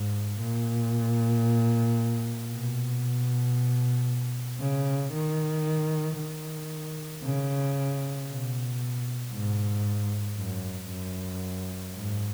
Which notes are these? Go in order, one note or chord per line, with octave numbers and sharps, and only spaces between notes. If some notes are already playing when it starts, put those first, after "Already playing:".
Already playing: G#2
A#2
B2
C#3
D#3
D#3
C#3
B2
G#2
F#2
F#2
G#2